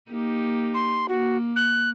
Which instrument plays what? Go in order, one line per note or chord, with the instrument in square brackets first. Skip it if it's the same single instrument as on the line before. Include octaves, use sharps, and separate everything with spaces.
[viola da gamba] A#3 D#4 G4
[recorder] C6
[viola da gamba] A#3 [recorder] F#4
[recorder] F#6